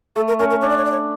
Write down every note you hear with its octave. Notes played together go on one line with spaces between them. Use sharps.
A3 A4
A#4
C#4 A#4
A#4
D4 C#5
D5
C#5
D5
C#5